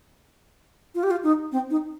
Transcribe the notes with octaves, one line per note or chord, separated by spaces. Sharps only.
F4
G4
F4
D#4
C4
D#4